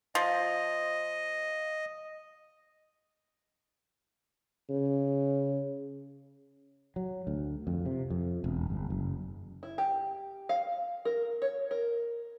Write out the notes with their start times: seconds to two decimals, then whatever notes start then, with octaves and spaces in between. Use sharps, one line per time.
0.15 F3 D#5
4.69 C#3
6.96 F#3
7.27 D2
7.67 F2
7.86 C3
8.10 F2
8.44 E1
8.70 G1
8.90 F#1
9.63 E4
9.78 G4
10.49 F5
11.05 A#4
11.42 C#5
11.71 A#4